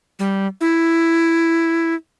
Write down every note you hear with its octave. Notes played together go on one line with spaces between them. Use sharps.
G3
E4